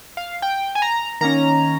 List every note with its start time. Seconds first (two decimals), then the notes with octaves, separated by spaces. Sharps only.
0.17 F5
0.42 G5
0.75 G#5
0.82 A#5
1.21 D#3 A#3 C#4 A#5